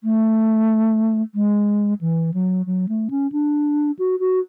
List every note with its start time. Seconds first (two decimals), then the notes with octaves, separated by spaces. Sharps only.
0.04 A3
1.35 G#3
2.01 E3
2.34 F#3
2.66 F#3
2.89 A3
3.11 C#4
3.32 D4
3.99 F#4
4.20 F#4